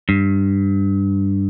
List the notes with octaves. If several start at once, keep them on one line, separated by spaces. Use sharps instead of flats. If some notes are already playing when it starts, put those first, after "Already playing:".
G2